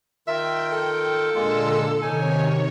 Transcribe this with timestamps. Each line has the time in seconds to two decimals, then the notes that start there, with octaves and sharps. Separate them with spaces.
0.27 D#3 F4 A#4 E5 G5
0.72 A4
1.35 A#2 D3 G#3 A#3 F4 E6
2.02 C3 D#3 D#4 C#5 G#5